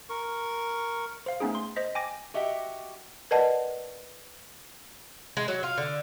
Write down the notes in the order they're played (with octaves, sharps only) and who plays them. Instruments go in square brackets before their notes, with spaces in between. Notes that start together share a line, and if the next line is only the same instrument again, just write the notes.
[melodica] A#4 C#6
[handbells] C5 F5
A3 B3 C#4 D#4 G#4
C6
C5 D#5 B6
G5 G#5 D6 A#6
[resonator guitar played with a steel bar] F#4 G4 D#5 E5 F#5 G5
[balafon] A#4 B4 D5 D#5 F#5 A5
[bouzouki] G#3
F#3
F4
D3